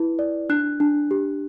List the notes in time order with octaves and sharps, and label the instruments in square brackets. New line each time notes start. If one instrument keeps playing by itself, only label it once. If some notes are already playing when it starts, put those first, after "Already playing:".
Already playing: [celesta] E4 B4
D5
D4 F#6
D4
G4